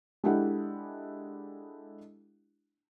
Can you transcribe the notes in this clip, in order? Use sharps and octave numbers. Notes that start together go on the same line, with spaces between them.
G#3 D4 E4 G4 A4 F#5